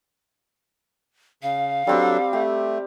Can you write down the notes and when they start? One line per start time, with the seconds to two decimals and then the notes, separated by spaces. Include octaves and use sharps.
1.43 C#3 F5
1.87 F#3 G3 C4 D4 G4 A4
2.33 A3 G4